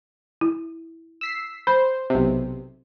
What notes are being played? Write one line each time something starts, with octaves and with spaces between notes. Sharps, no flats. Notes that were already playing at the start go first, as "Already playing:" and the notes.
E4
E6 B6 C7
C5 B5
B1 C3